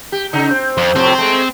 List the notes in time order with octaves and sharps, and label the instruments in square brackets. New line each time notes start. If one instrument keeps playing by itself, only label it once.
[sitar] G4
C#3 D#4
C4
[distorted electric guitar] F2
[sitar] F2 A2 C3 [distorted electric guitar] C4
[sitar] G#3 A3